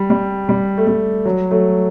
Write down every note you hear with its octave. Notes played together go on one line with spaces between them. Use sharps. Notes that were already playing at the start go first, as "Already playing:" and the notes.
Already playing: G3
G3
G3
A3
G3
F#3
F#3 A3